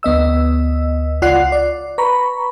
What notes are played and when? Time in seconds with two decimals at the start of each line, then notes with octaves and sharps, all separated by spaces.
0.03 D2 B3 D#5 E6
1.22 C#2 F4 D5 F#5 F#6 C7
1.52 D5
1.98 B4 A#5 B5 C#6